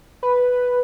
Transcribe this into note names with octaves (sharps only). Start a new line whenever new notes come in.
B4